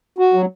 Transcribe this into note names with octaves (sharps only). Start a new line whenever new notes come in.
F#4
F#3